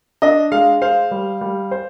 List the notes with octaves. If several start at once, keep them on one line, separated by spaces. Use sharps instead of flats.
D4 D#5
G#3 F5
C5 F5
G3
G3
C5